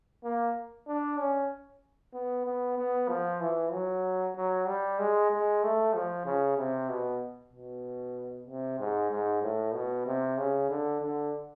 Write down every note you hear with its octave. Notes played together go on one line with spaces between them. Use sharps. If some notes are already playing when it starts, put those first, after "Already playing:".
A#3
D4
C#4
B3
B3
B3
F3
E3
F#3
F#3
G3
G#3
G#3
A3
F3
C#3
C3
B2
B2
C3
G#2
G#2
A2
B2
C3
C#3
D3
D3